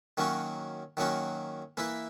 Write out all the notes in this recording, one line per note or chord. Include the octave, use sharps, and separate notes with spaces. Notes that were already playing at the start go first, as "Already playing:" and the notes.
D#3 F#3 A#3 C#4 F#4
D#3 F#3 A#3 C#4 F#4
E3 A#3 E4 B4